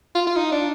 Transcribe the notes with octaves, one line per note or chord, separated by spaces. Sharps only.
F4
F4
D#4
D4